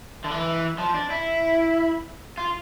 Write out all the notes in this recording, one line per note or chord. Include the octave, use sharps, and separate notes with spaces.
D3
E3
F3
D4
E4
F4